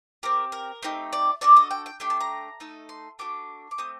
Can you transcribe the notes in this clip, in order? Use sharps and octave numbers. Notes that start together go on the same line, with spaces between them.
C4 G4 A#4
A#4
A3 C4 D#4 G4
D5
D4 F#4 A4 D5
D#5
G5
G5
A3 D4 G4 G5
A5
A#5
A3 D#4 A4
C6
A3 D4 F#4 D6
D6
A3 C4 D#6